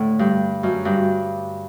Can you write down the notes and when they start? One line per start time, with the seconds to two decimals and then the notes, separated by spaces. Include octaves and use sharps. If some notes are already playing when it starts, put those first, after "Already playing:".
Already playing: A2 D3
0.19 G2
0.63 F#2
0.85 G2